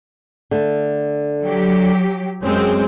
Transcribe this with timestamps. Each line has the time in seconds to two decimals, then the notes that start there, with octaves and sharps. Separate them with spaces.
0.51 D3 A3
1.43 F#3 G4
2.43 F#2 G#3 C4 C#4